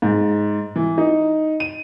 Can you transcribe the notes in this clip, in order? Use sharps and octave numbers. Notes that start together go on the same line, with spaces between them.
G#2
E3
D#4
D#7